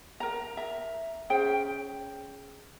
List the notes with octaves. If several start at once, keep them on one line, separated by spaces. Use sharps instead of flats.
A#4 A#5
E5 A#5
C#4 G#4 C5 G5